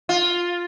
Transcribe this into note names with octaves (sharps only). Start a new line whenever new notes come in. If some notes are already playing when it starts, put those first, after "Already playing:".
F4